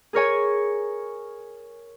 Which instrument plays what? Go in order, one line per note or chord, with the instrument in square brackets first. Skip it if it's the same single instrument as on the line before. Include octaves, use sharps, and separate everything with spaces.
[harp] G#4 A#4 C#5 G#5